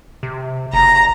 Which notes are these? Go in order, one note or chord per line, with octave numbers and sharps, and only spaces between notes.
C3
F#1 A#5